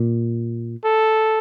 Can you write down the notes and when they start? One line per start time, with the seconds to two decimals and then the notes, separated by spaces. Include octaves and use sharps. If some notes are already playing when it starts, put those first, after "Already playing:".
Already playing: A#2
0.84 A4